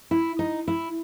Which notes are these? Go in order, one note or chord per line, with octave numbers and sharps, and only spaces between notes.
E4
D#4
E4